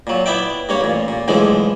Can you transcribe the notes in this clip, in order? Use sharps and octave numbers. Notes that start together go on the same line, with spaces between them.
A#2 F#3
B3 E4 D5 E5 G5
G2 A#3 C#5
A1 A#2
A#2
B1 A2 D3 E3 F3 G#3